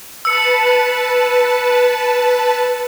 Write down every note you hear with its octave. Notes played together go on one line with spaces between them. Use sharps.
B4 A5 E6 C#7